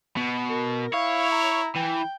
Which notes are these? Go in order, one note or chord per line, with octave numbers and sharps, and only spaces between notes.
B2
A#4
E4 C#5 F5
A#5
E3 G5